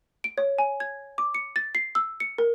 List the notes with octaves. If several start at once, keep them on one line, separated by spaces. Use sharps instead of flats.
D7
C#5
G#5
G#6
D6
C#7
A6
C7
E6
C#7
A#4